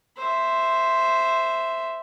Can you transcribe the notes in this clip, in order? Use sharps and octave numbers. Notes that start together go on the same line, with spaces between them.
C5 E5